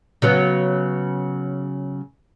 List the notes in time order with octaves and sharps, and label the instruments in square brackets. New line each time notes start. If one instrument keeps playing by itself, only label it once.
[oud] C#3 F#3 B3